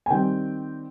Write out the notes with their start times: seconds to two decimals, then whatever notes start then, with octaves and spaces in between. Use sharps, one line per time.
0.06 G#5
0.10 D#3 G3 C4 G5